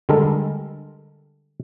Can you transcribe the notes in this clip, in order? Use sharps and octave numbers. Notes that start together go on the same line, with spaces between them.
D3 G3 G#3 A4 A#4